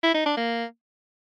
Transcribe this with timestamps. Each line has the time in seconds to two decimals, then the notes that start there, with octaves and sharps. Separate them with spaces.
0.03 E4
0.14 D#4
0.26 D4
0.37 A#3